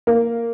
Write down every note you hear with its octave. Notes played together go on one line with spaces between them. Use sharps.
A#3